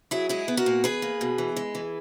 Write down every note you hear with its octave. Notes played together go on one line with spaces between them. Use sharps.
F#3 E4 G#4
G#3 E4 G#4
B3
F#4 A#4
A#2
E2 G#4 B4
A#3
B2
E3
G#3
E3